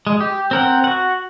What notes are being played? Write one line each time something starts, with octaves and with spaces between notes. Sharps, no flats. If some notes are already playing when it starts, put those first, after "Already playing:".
G#3
G4
C4 A#4 F#5
F#4 F#5